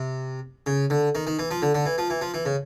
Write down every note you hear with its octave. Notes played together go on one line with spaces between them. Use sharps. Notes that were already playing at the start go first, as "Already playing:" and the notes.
Already playing: C3
C#3
D3
D#3
D#3
E3
F3
D3
D3
E3
F3
E3
F3
E3
C#3